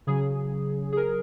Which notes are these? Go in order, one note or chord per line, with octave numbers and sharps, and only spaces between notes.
C#3 F#3 G#4
G#4
A#4